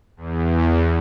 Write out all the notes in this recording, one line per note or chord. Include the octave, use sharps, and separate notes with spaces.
E2